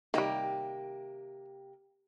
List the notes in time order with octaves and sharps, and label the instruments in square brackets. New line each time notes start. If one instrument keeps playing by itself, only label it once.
[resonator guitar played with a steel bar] C3 A#3 G4 [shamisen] D#3 G3